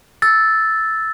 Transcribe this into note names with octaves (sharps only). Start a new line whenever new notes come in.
E6 A6